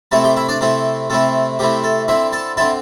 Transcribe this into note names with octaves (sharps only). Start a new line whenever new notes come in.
C3 A3 C4 E4 A4 A5
G4 G5
E4 E5
D4 D5
C3 A3 C4 E4 A4
C3 A3 C4 E4 A4
C3 A3 C4 E4 G4
A4
D3 C4 E4 E5
A4 A5
D3 C4 E4 A4 A5